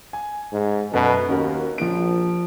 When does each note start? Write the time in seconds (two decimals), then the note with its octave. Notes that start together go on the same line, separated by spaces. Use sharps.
0.13 G#5
0.52 G#2
0.93 F#2 B2 A4 B4
1.29 D#2 C#4 F#4 A#4
1.78 A#1 F3 D7